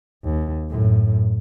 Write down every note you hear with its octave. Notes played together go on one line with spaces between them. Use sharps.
D#2
F#2 A2